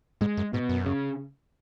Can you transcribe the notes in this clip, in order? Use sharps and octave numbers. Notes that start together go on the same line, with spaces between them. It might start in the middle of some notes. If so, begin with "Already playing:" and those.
G#2 G#3
F#2
G#2 B2
F#2
C#3